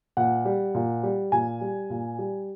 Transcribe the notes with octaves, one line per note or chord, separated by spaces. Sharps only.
A#2 F#5
G3
A#2
G3
A#2 G#5
G3
A#2
G3